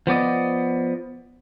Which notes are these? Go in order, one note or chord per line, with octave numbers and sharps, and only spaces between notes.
F3 B3 D5 D#5